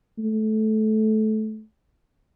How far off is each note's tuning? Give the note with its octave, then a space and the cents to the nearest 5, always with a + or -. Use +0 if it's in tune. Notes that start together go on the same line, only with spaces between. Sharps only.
A3 -20